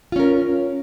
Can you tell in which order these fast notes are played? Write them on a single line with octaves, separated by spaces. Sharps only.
F4 C#4 A#4